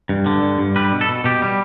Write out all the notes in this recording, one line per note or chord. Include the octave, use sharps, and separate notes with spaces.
G2
D3
G2
G2
G3 B4
B2
A4
B2
B2 G4
G3